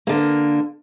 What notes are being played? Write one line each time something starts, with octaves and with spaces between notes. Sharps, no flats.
D3 A#3